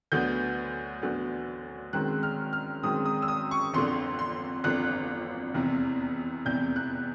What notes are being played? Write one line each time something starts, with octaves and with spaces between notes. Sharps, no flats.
D2 D3 F#3 B3 G6
D2 D3 F#3 B3
F#2 D#3 G#3 C4 F#6
F6
F6
F#2 D#3 G#3 C4 D#6
D#6
E6
D#6
C#6
G1 F2 D3 C6
C6
G1 F2 D3 F#6
F1 E2 C3
F1 E2 C3 G6
F#6